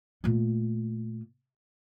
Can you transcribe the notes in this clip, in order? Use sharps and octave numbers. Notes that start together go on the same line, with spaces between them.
A#2 A3